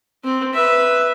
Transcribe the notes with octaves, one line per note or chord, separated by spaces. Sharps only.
C4
B4 E5